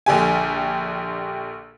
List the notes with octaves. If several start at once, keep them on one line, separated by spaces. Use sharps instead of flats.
A#1 D3 G4 G#5